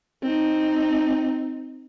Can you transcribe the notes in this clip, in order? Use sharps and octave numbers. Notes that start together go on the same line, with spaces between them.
C4 D#4